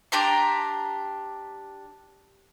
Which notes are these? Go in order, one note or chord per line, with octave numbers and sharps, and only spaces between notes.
D4 G4 A#5 C6